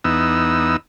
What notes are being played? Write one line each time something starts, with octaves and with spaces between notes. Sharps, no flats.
E2 B3 D#4 E6